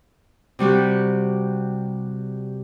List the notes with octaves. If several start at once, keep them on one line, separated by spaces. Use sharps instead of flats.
C3 G3 F#4 G4